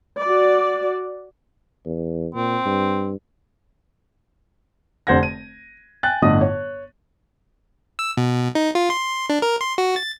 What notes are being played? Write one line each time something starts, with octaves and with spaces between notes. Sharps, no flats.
F#4 D5
E2
A#2 C4
G2
F1 D3 C5 F#5 G#6 A#6
D#7
G5 G#5 F#6 A6
G1 A2 D3 D#5 D#6
C#5
E6
B2
D#4
F4
C6
D4
A#4
C6
F#4
A6